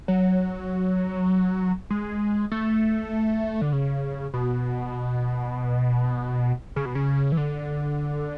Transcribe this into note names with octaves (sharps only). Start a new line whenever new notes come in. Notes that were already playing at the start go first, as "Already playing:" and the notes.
F#3
G#3
A3
D3
C#3
B2
C#3
B2
C#3
E3
D3